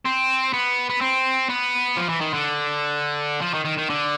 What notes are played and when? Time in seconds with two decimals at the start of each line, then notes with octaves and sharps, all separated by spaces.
0.06 C4
0.53 B3
0.90 B3
1.01 C4
1.50 B3
1.97 F3
2.09 E3
2.21 D#3
2.34 D3
3.42 F3
3.54 D#3
3.65 D#3
3.78 D#3
3.90 D3